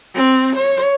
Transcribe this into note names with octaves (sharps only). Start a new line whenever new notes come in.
C4
C#5